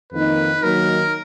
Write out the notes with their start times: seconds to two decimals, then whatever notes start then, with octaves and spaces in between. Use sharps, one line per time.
0.12 F2 D#3 A#3 D#4 B4
0.62 D#3 F#3 A#3 D#4 A#4